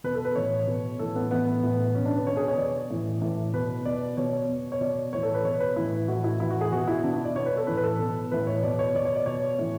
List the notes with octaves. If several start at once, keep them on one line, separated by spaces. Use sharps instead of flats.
B2 B4
A4
B4
A2 E3 C#5
B2
A2 E3 A4
B3
A2 E3 B3
A2 E3
B2 C#4
D4
B4
B2 C#5
G#4
C#5
B2 D5
A2 E3
A2 E3
B2 B4
B2 D5
B2 C#5
B2
C#5
B2 D5
A2 E3 C#5
A4
B4
B2 C#5
B4
A2 E3 E4
A2 E3 F#4
E4
A2 E3 E4
F#4
G#4
B2 F#4
E4
B2 D4
E4
D5
B2 C#5
B4
A4
A2 E3 B4
B4
A4
B2
A2 E3 B4
C#5
B2 D5
C#5
B2 D5
C#5
D5
B2 C#5
A2 E3